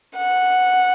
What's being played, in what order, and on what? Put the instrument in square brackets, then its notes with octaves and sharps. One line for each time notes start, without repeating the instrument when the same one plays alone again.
[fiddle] F#5